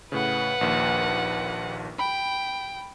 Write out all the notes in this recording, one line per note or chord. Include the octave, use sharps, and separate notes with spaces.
A2 C#3 B4 F#5
A#1 D#2
G5 B5